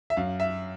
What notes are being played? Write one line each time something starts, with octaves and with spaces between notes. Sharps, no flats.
E5
F#2 F5
E5